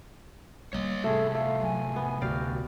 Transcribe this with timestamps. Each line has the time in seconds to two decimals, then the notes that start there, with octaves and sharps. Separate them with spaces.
0.73 G3 A#3 C#5 D#5
1.04 A2 C3 A3 G#4 A4
1.35 A3 F5
1.62 F#3 G#5
1.96 B3
2.22 D2 F#4 G4 D5 F5